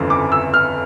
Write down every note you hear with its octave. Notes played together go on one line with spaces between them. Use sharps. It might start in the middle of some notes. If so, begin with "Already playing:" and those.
Already playing: G1 F2 C#3 E3
D6
E6
F6